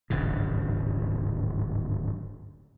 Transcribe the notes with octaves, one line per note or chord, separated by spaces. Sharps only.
D1 G#1 G2 C#3